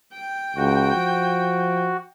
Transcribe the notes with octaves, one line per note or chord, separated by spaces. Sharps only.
G5
C#2 F#4
F3